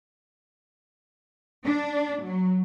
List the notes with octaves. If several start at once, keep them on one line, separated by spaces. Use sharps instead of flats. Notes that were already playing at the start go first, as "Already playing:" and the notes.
D4
F#3